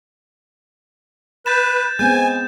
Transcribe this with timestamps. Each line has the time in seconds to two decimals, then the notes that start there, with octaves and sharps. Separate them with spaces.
1.46 B4 G6 A6 E7
1.99 G#3 B3 C4 G#5 G6